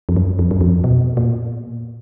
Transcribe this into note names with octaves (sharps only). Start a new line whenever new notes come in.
F2
F#2
F2
F#2
F2
B2
A#2